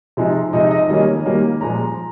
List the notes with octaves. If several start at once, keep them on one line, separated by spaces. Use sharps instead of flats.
C3 F3 G#3 D#4
C3 F3 G#3 D#4 D#5
D#5
D#3 G3 A#3 C#4 D#5
D#3 G3 A#3 C#4
A#2 F3 G#3 A#5